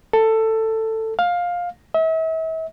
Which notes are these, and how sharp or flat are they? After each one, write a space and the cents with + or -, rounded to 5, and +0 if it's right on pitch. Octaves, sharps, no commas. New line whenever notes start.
A4 +15
F5 +15
E5 -40